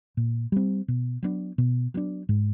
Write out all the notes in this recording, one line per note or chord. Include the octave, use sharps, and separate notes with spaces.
A#2
G3 C4
B2
F#3 B3 D4
B2
F#3 B3 D4
G#2